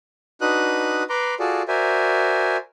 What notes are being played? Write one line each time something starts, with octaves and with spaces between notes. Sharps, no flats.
D4 D#4 F#4 B4 D#6 F#6
B4 A#5 C6 D6
F4 F#4 G#4 A4 D5
F#4 A#4 C5 D5 E5 G#5